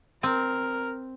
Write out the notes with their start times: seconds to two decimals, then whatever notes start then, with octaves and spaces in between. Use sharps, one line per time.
0.23 C4 A#4